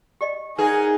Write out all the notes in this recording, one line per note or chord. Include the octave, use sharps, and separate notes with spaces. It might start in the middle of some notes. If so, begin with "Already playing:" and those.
G4 D5 D#5
D#4 G#4 A#4 B4 F#5 G#5